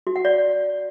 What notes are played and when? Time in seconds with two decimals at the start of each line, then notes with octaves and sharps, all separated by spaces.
0.07 F#4
0.16 F#5
0.25 D5